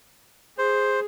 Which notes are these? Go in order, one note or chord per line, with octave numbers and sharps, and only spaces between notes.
G#4 C5